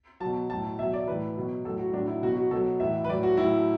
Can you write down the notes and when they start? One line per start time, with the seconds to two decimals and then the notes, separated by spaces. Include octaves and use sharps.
0.20 F#3 A5
0.26 B2
0.50 A2 F#3 A5
0.78 B2 E5
0.82 F#3
0.93 D5
1.07 A2 E3 B4
1.35 B2 F#3
1.65 A2 F#3 A4
1.79 F#4
1.93 A2 F#3 D4
2.08 E4
2.23 B2 F#3 F#4
2.36 F#4
2.51 B2 F#3 A4
2.80 A2 E3 E5
3.04 B4
3.09 A2 D5
3.12 F#3
3.23 F#4
3.37 A2 F#3 E4